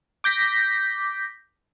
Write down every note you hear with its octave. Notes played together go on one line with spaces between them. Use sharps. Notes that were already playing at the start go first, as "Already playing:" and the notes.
D6 G6 A#6 B6